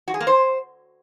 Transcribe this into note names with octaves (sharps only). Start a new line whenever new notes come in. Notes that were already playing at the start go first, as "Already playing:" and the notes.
F#4
G#4
A#3
C5